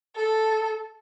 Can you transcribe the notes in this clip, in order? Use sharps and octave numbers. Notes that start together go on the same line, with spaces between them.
A4